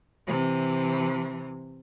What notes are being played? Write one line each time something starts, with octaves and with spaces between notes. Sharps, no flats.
C3 E3